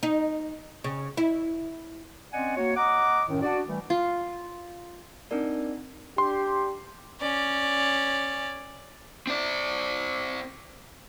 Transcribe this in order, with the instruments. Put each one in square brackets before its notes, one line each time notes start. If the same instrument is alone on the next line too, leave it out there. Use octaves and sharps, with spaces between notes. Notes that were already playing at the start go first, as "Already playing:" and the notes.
[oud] D#4
C#3
E4
[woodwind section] C4 C#4 D5 D#5 F#5 G#5
A#3 F#4 C#5
D#5 F#5 A#5 D6
F#2 A2 D#3
D4 F#4 D5
E3 G3 A3
[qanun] F4
[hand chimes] C4 D4 D#4 A#4 D5
[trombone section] D4 G4 [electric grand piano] C6
[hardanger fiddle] C#4 D5
[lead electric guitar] C4 D5